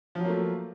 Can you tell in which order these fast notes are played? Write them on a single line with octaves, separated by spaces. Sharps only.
F3 F#3 A#3 A3